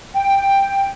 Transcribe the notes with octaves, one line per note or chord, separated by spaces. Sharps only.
G5